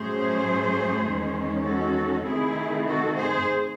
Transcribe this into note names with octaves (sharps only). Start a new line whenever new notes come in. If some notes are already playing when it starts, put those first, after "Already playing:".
Already playing: A2 F#3 A3 C#4 G#4 C5
E2 D#3 G#3 C#4
F#4 A4
C3 D#3 A3 C4 E4 G#4
F#4 A4
G#4 C5